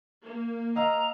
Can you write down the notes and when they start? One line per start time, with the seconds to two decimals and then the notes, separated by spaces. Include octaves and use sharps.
0.23 A#3
0.75 D#5 F5 A#5 E6